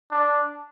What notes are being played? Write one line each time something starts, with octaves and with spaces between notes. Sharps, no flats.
D4